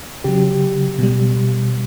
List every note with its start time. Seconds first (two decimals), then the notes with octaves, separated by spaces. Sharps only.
0.24 C#3 F#3 G4
0.99 B2 G3